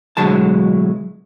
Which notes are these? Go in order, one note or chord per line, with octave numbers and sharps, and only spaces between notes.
B1 A2 D3 F#3 G#3 A5